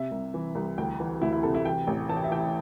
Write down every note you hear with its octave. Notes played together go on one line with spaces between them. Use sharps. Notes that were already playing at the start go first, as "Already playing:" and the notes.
Already playing: C3 E5
C2
E3
C2
D2 G5
E3
D2 E4
E4
C3 A4
E4
E3 G5
A1
E3 A5
G5
E5
E3 G5